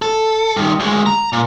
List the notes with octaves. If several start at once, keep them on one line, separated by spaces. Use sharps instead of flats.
A4
G2 D#3
D2 G#3
A#5
A#2